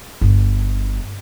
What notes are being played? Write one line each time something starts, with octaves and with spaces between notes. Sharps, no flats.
G1